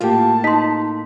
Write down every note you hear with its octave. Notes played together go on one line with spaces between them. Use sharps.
A2 A#3 F4 G4 A5
D#4 C6 B6